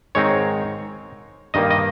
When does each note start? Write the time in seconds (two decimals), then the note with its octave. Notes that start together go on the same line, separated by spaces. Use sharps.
0.15 G#2 D#3 G#3 C4 D#4 C#5
1.54 G2 D#3 G3 A#3 D#5
1.70 D#5